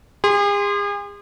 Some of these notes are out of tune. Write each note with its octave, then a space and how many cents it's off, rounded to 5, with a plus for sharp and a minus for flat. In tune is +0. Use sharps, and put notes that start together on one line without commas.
G#4 -40 C6 +0